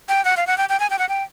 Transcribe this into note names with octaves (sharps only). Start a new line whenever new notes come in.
G5
F#5
F5
F#5
G5
G5
G#5
G5
F#5
G5